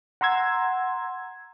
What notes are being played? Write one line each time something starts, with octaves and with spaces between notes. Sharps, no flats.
F#5 A#5 C6 E6 G#6